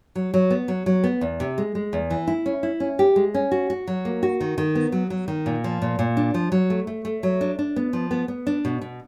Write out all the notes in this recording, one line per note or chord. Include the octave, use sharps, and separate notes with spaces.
F#3
F#3
B3
F#3
F#3
B3
E2
C3
G#3
G#3
E2
E3
E4
C#4
E4
C#4
G4
G#3
C#4
F#4
F#4
F#3
A#3
F#4
D#3
D#3
B3
F#3
F#3
D#3
A#2
F3
A#2
A#2
D4
F3
F#3
A3
A3
A3
F#3
D4
D4
B3
F3
B3
B3
D4
B2
B2